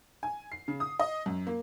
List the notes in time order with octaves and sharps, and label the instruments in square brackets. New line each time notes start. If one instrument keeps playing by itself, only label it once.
[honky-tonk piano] G#5
C7
C#3
D#6
D#5
F#2
A#3